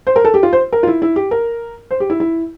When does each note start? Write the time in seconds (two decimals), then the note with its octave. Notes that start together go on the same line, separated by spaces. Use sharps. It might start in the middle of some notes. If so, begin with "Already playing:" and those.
0.07 C5
0.16 A#4
0.25 A4
0.34 G4
0.43 F4
0.53 C5
0.73 A#4
0.83 F4
0.87 E4
1.02 E4
1.16 G4
1.31 A#4
1.91 C5
2.00 G4
2.10 E4
2.20 E4